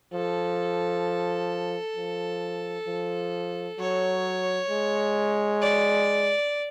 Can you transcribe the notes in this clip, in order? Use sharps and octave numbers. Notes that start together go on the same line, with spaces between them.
F3 A4
F3
F3
F#3 C#5
G#3
D5